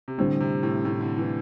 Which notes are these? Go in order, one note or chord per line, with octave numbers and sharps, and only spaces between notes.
C3
A2 D3 G3 C4
C3
A2
A2
D3
E3